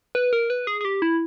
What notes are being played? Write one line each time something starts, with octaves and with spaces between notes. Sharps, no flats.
B4
A#4
B4
G#4
G#4
G4
E4